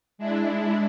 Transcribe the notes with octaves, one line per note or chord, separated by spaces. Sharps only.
G#3 D4 E4